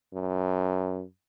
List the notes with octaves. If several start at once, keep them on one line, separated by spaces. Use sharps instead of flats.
F#2